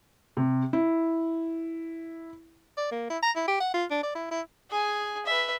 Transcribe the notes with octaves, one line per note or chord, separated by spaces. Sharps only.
C3
E4
D5
A#3
E4
A#5
E4
G4
F#5
F4
D4
D5
E4
E4
G#4 G#5
B4 E5